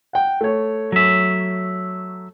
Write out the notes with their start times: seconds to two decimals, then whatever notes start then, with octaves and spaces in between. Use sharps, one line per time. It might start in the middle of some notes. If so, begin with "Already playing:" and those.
0.13 F#5 G5
0.41 A3 C#5
0.92 F#3 E5